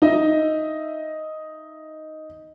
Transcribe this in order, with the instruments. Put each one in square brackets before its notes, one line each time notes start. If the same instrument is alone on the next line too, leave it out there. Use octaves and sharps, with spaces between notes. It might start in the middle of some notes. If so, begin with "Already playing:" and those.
[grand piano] D#4 D#5 E5